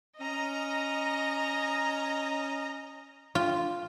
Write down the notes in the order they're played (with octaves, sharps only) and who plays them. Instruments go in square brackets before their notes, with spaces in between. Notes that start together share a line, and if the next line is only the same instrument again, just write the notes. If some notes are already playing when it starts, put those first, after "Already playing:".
[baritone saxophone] C#4 [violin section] D#5 A#5
[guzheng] F4